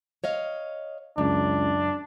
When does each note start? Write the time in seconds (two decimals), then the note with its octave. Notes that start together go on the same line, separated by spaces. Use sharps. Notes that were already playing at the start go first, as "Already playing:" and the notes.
0.24 C#5 D#5 F5
1.18 C#2 F#2 D4